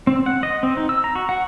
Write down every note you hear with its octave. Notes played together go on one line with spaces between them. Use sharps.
C4
F#5
D#5
C4
D#4
E6
A#5
F#4
F#5